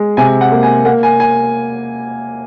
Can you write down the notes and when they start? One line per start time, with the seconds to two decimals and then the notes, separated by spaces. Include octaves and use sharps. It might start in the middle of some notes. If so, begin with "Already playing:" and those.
Already playing: G#3
0.17 C3 G#5
0.41 F#5
0.52 A#3
0.63 G#5
0.85 A#3 F#5
1.03 G#5
1.20 G#5